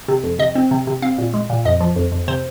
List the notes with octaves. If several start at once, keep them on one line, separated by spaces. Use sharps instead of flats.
C3
F2
C3 D#5
C4
C3
C3
C4 F5
A#2
G#3
A#2
F2 D#5
F3
F2
F2
C3 C5